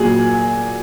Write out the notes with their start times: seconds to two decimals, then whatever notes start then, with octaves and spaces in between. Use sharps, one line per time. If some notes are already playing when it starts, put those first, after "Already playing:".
Already playing: A#2 F#3 G#4